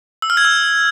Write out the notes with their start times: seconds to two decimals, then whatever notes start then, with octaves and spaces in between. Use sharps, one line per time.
0.22 E6
0.30 F6
0.37 G#6
0.45 E6